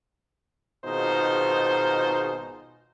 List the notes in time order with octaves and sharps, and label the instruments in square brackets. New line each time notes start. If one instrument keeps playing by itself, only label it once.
[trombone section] G#1 B2 D#4 F4 G#4 C5